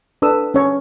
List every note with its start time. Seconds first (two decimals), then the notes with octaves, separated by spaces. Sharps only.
0.22 D4 A4 B4 D#6 E6
0.54 C#4 C#5